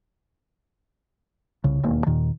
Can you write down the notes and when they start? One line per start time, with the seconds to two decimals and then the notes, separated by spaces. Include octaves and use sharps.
1.64 C2 C#3
1.83 E1 D#2 A#3
2.06 D#2 A#2 D#3